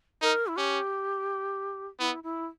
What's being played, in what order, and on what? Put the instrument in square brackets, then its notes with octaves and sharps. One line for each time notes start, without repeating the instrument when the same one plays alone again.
[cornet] D#4 [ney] A#4
[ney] E4
[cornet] C#4 [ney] G4
[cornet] B3 [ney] E4
[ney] E4